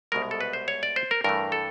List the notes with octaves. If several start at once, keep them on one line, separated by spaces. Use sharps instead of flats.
C2 B2 G#3 A#4
A4
B4
C5
C#5
D5
C5
A#4
G2 E3 A3 A#4
A4